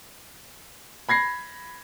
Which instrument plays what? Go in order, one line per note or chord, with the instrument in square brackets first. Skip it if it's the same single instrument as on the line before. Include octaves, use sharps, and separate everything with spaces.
[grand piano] B5 G#6 A#6 C7